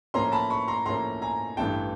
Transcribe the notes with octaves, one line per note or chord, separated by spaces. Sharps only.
A2 F3 A#3 C#4 A#5 C6
A5 B5
B5 C#6
A#5 C6
A2 F3 A#3 C#4 A#5 C6
G#5 A#5
A1 G2 E3 A3 G5 A5